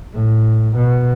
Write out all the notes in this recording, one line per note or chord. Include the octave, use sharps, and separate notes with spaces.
A2
B2